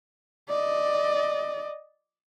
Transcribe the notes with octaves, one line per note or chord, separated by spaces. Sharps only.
D5 D#5